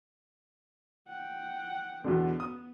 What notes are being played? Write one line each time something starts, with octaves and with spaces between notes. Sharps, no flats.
F#5 G5
E2 B2 D3 B3
D#6